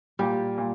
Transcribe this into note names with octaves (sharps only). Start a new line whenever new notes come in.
A#2 G3
A#2